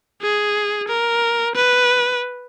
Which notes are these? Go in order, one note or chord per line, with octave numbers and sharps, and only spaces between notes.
G#4
A#4
B4